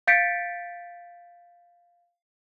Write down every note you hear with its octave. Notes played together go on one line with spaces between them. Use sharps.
F5 G6 A6 B6 C#7 D7